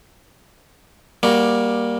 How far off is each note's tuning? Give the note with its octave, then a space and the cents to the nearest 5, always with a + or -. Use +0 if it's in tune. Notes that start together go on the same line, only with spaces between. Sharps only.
G3 +5 A#3 +15 F#4 +0